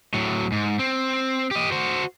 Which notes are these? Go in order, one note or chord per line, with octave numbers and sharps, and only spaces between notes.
A2 F#3
G#2
C4
G4 D#5
F#4 C5